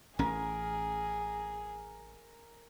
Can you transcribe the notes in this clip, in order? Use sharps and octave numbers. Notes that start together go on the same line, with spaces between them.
A1 C#4 G#4 A#4